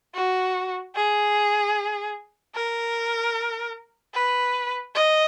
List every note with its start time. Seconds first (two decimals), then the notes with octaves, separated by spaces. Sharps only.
0.14 F#4
0.95 G#4
2.55 A#4
4.14 B4
4.95 D#5